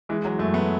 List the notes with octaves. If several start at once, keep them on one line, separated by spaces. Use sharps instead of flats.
E3 G#3
F#3
F#2 A3
B3